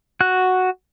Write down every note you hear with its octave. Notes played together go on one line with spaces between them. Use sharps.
F#4 F#6